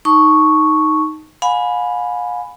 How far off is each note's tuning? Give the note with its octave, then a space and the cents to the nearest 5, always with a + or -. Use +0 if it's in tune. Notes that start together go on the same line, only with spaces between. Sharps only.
D#4 +0 A5 +0 C#6 +0
F5 +45 G#5 +0 B5 +0